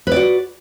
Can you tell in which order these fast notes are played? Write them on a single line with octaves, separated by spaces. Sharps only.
B4 D5 F#4